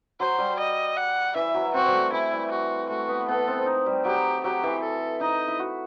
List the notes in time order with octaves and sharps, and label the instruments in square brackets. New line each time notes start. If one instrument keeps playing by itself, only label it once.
[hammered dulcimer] F#3 [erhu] C5
[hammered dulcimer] G3
[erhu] D#5
F#5
[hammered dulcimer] E3 [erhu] E5
[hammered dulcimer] F#3
[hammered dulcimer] C4 [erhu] F#4
[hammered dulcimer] G3
A3
[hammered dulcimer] E3 [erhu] E4
[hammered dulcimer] G3
[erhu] F#4
[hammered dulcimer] A3 [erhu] F#4
[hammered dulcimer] B3
[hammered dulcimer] B3 [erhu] A4
[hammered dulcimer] C4
D#4
G3
[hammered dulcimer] F#3 [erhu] G4
[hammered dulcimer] F#3 [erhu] G4
[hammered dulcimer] E3
[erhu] A4
[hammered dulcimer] D#4 [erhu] D#5
[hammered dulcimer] E4
F#4